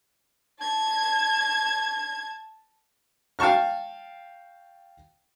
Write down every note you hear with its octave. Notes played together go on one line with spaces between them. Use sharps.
A5 G#6
F5 G5 A5 C#6 F6